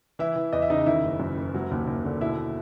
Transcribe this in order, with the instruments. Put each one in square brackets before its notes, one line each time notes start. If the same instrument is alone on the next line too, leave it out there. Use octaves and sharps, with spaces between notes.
[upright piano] E3 E4 E5
E3
E2 D#5
E5
C#3 D#4 D#5
D#3 E4 E5
F#1
F#2
F#1
F#3
D#2
D#2
D3
B2 E4 E5